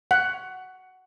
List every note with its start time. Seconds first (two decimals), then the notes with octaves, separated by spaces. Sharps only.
0.11 F#5